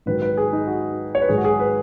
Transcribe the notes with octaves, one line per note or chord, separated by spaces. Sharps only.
G#2 D#3 F#3 B4
B4
G#4
D#4
F#4
C#5
B4
G#2 D#3 F#3 G#4
F#4
G#4
B4